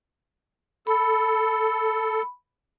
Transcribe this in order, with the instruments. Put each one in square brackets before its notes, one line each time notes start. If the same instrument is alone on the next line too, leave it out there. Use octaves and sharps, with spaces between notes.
[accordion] A4 [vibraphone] B5